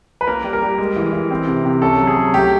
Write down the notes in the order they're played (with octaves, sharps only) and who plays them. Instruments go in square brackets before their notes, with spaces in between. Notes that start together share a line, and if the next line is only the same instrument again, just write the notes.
[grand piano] B4
A#3 A#4
G3
A#4
G3
G#3
E3
E3
C4
C3
C3
C#4 A4
F#3
G#4
F#3
A3 G4